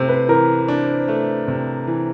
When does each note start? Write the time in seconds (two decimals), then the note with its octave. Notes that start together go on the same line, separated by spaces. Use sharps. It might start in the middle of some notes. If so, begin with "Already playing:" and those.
Already playing: C3 A3 C5
0.09 B4
0.28 E3 A#4
0.68 D4
1.08 A3
1.48 C3
1.87 E3